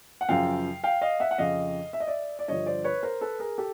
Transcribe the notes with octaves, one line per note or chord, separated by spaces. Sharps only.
F#5
F#2 C#3 F3 F5 G5
F5 G5
D#5 F5
E5 F#5
F#5
F2 C#3 F3 D#5 F5
E5
D#5
D5 E5
D5
G2 D3 F3 C#5 D#5
C5 D5
B4 C#5
A#4 C5
A4 B4
G#4 A#4
G4 A4